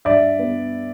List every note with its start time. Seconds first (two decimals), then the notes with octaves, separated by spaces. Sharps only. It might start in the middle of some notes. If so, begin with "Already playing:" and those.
0.05 G2 D5 E5
0.39 B3